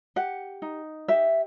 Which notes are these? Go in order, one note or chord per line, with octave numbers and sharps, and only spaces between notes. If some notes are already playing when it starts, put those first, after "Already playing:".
G4 F#5
D#4
G4 E5